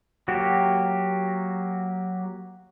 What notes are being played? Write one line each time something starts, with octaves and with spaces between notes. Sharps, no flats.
F#3 A#3 F#4 G4